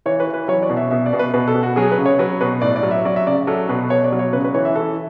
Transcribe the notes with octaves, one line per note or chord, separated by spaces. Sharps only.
E3 C#5
B4
E3
B4
F#3 C#5
D5
B2
E5
B2 E5
D5
B2
B4
B2 B4
A4
B2
F#4
F#3 G#4
B4
C#3
C#5
F#3 B4
B2 B4
A2 D5
D5
F#3
E5
F#3 D5
E5
C#3 D5
F#3 A4
B2 B4
B2 C#5
D5
F#3
C#5
C#3 B4
B4
E3 C#5
E5
E3 A4